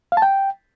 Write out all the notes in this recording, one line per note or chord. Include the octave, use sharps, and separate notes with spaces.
F5
A5
G5